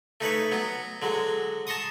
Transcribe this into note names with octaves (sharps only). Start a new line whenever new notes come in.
A3 D#4 B4 C#5
F#3 B3
D3 F#3 G#3
A5 A#5 C6 C#6 D#6